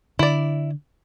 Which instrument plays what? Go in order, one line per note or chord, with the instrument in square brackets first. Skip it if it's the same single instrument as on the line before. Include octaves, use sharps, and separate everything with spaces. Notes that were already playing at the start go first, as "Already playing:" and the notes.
[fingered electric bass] D3 [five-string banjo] E4 D5